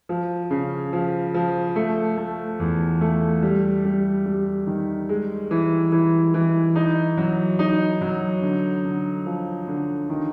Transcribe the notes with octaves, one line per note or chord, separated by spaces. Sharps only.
F3
C#3
F3
F3
A3
A3
E2
A3
G3
G3
G3
D#3
G#3
E3
E3
E3
D#4
F#3
D#4
F#3
D3
D3
F3
D3
D#3